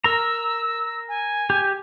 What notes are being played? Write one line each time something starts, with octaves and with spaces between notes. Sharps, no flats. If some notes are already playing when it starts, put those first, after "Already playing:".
A#4 A#5 E6
G#5
G4